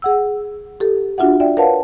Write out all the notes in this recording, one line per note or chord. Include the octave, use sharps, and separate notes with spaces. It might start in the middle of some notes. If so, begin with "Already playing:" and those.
G#4 F#5 E6
G4 A4
D4 F4 F#4 E5 F#5
D5 E5 G5
A#4 B4 C#5 F5 F#5 A5